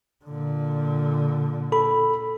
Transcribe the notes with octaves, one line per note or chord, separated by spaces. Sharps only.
A#2 D3
A4 B5